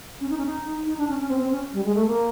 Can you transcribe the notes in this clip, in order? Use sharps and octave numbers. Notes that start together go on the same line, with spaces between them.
C#4
D#4
C#4
D#4
D#4
D4
C#4
C#4
C4
C4
C#4
G3
G#3
A3
A#3